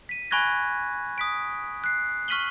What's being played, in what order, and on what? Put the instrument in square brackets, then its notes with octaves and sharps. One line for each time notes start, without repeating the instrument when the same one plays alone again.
[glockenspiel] B6 D#7
G#5 B5 C#6 F#6 G#6 A#6
D#6 B6 D7
F#6 C7
C#6 F6 B6 D#7 F#7 G7